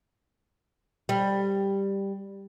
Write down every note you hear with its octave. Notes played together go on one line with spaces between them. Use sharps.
G3